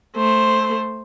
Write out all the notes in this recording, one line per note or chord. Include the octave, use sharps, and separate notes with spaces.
A3 C5